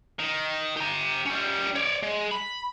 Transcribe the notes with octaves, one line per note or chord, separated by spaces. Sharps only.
D#3
G4 A#5
G3 C#4
C#5 D5
G#3
B5